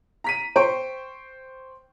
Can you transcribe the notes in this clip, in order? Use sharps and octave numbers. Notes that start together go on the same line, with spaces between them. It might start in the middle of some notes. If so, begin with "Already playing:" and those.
A#5 B6 D#7
C5 G5 C#6 D7